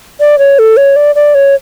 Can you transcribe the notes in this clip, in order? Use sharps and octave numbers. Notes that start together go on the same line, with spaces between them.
D5
C#5
A4
C#5
D5
D5
C#5